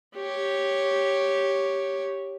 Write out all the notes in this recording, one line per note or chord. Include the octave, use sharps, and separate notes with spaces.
G4 C#5